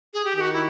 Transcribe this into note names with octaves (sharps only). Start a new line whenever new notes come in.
G#4
G4
D#3 G4
F#4
E4